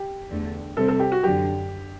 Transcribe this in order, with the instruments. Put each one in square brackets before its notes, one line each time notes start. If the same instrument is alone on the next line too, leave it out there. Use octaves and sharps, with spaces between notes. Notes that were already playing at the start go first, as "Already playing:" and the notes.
Already playing: [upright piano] G4
[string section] E2 D3 A3
[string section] C3 G3 C4 [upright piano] A4
[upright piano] A4
G4
F#4
[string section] F#2 D3 F#3 [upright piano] G4